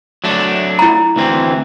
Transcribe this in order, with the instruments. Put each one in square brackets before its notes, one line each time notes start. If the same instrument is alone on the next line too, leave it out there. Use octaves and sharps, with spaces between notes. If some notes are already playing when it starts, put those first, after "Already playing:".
[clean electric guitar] F#3 A3 D4
[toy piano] E4 A#5
[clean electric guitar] D2 E3 C4